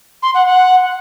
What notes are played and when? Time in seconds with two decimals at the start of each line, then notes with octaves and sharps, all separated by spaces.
0.23 C6
0.34 F#5
0.46 F#5